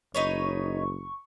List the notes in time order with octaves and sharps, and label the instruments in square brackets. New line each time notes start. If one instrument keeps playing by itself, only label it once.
[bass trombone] F#1 [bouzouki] D#4 B4 C#5 [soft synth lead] C#6